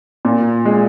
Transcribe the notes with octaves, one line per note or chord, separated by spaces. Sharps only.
A#2
G#3